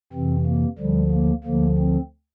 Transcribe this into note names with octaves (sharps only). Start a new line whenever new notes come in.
F2 C3 E3 C4
A#3
D2 D3 F3 G3
A#3
D2 D3 F3 A#3
C4